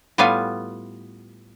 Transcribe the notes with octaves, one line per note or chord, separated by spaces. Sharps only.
A2 G3 B3 F4 F5 G#5